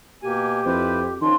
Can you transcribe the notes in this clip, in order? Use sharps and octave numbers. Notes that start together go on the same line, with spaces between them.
B2 A#3 G4 G#5
F2 E4 B4 C5
D#3 F3 C#4 D4 C6